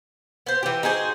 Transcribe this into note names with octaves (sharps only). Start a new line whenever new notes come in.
B3 C5
E3 G4
D#4 F#4 G#4 C5